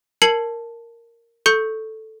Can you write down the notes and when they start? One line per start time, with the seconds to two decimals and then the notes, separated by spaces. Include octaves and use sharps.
0.22 A#4 A5 G#6 C7 C#7 F#7
1.46 A4 C#6 G6 C#7